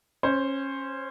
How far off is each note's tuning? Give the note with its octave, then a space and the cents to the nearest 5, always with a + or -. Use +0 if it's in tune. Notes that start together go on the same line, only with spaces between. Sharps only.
C#4 -20 C5 +0